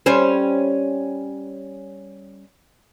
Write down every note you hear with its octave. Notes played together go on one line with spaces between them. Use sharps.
G3 C#4 C5